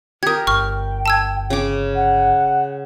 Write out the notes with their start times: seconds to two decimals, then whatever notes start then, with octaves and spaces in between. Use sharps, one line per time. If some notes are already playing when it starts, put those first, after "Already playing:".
0.23 G4 A#4 D#6 G#6
0.47 G1 G5 C#6 F6
1.06 A5 E6 G#6
1.50 C#3 D6
1.95 F#5